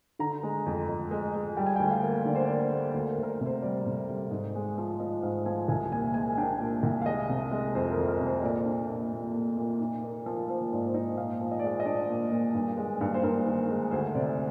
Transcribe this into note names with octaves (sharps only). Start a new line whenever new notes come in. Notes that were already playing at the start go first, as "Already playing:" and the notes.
D3 A#5
G#3
F2
F2
G#3
G#3
G3 G5
G#5
D2 G5
F5
A#3
D3 D5
C5
A#3 D5
A#3
D2 C5
A#4
D2
A#4
C5
C3
C5
G3 D5
C3
G3
G#2
G#3
F3
F3 D#5
G#2 F5
F3 G#5
C2 G#5
A#2 G#5
G#3 G#5
D4 G5
A#2
C2
F5
G#3 D#5
C3
G#3
F2 C5
A#4
F2
A#4
C3
C5
A#2 D5
D4
A#2
A#2
A#2
A#2
D#4
A#3
F3
F3 C5
G#2 D5
D#4 D#5
A#2 F5
F3
D#5
D5
G#3 D#5
D#5
D4 D5
A#2
A#2
G2
G#3
G2
C5
G2 A#4
D#3
G#3
D2 C5
C3 D5